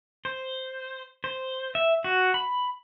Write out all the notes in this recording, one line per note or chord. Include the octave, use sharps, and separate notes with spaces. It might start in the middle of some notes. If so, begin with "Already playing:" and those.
C5
C5
E5
F#4
B5